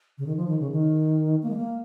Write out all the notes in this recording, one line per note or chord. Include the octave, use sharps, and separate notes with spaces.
C#3
D#3
F3
D#3
C#3
D#3
A#3
G#3
A#3